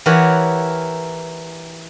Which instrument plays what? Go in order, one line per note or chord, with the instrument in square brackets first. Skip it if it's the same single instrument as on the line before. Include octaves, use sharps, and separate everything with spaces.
[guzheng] E3 G4 A#4 C#5 F#5